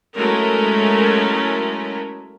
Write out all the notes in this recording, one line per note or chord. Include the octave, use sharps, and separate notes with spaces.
F#3 G#3 A3 C#4 E4 A#4